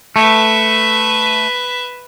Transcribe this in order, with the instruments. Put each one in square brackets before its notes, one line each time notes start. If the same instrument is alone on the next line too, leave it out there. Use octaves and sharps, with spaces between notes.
[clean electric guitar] A3 [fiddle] B4 E5